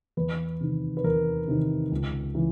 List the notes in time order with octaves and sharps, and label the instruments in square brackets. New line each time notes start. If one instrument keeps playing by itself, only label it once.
[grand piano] E2 B4
C3 D#3
B4
E2 A#4
C3 D#3
C#2
C#3 E3